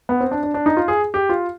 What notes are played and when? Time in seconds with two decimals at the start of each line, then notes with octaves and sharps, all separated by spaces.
0.09 B3
0.21 C4
0.31 D4
0.43 D4
0.54 D4
0.66 D#4
0.77 F4
0.88 G#4
1.14 G4
1.29 F4